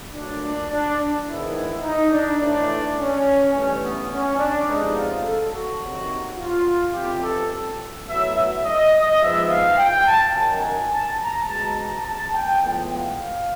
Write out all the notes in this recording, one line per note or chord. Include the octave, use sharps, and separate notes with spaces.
A#2 F#3 A3 D4
D4
D4
G#2 D#3 G#3 B3 E4
D#4
D4
A2 E3 A3 D4
C#4
G2 E3 A3 C#4
B3
C#4
D4
C3 F3 G#3 B3 D#4
F4
A4
F#4
C3 D#3 F#3 A#3
F4
F2 C3 E3 G4
A4
A2 F#3 B3 E5
E5
D#5
D#5
G#2 F3 G#3 B3 E5
F5
G5
A5
F#2 D#3 F#3 G#5
A5
A#5
B2 G#3 B3 A5
A#5
A5
G5
A2 F3 G#3 B3
F5